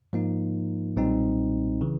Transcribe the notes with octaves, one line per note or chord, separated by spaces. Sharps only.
G#2 F3 A#3 D#4
B1 A#2 G3 C4 D#4
C#3 E3